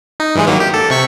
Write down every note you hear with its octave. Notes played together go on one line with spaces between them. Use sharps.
D#4
G2 E3 G#3
D#3 F#3 A#3
G4
A4
C3 C#6 B6